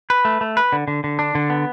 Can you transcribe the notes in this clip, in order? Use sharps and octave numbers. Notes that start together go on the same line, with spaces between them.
B4
A3
A3
B4
D3
D3
D3
D4
D3
B3